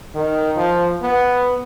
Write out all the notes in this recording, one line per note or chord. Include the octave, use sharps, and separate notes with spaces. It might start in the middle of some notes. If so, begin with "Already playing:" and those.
D#3
F3
B3